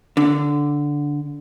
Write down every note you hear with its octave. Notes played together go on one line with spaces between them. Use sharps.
D3